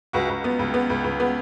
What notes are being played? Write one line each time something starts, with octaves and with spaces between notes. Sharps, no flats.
C#2 F#4
C#2
B3
C#2
B3
C#2
C#2
B3